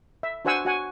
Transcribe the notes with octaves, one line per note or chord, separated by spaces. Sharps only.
E5
D4 F#4 C5 F#5 G#5 E6
F#4 F#5 G#5